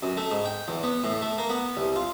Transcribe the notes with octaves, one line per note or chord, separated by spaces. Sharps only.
F#2
A3
G#2
G5
E2
B3
A2
A3
A#3
B3
C2
F4